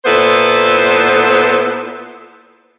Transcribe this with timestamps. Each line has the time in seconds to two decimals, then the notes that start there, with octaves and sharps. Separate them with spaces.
0.05 A#2 B3 E4 A4 C5